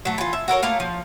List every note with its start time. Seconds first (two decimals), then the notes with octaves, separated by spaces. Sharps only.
0.05 F#3 A3
0.18 E3 F4
0.33 E5
0.48 F#4 A4 A#4 C#5
0.62 A3 A#3 F4 F5
0.80 F3